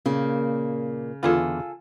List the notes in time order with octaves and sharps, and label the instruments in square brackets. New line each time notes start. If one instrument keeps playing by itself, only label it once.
[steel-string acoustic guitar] A#2 A#3 [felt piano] C#3
[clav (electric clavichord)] E2 D3 B4 [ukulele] F4 G#4 A4